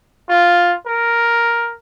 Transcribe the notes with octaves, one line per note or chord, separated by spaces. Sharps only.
F4
A#4